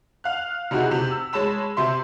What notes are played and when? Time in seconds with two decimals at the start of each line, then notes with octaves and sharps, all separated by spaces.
0.24 F5 F#6
0.71 C3 D#4 E4 F#4 G#4
0.91 C3 F7
1.11 E6
1.33 G#3 C#5 A5 B5 E7
1.77 C3 E5 C6